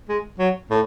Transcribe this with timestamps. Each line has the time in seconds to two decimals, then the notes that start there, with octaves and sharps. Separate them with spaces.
0.09 G#3
0.39 F#3
0.70 A2